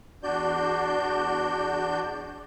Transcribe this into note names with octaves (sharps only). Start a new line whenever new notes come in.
E2 D4 F#4 D5 G6